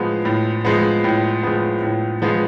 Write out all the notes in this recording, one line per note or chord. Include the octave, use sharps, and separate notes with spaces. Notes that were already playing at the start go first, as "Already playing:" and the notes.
Already playing: A2 F3 G#3 B3
A2
F3 G#3 B3
A2
F3 G#3 B3
A2
F3 G#3 B3